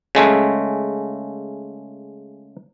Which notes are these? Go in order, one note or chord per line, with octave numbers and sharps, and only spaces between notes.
C#3 G#3 A3